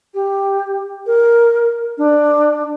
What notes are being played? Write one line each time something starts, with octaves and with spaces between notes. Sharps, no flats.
G4
A#4
D4